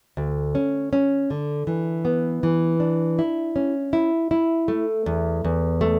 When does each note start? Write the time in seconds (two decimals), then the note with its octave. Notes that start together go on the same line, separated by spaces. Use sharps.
0.17 D2
0.55 C#4
0.93 C#4
1.30 D3
1.67 E3
2.05 B3
2.43 E3
2.80 D4
3.19 E4
3.56 C#4
3.93 E4
4.31 E4
4.68 A3
5.06 E2
5.45 E2
5.81 A3